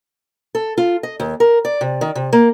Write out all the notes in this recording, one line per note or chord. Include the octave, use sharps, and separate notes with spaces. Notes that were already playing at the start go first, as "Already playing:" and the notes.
A4
F4
D#5
D#2
A#4
D5
C3
D#3
C3
A#3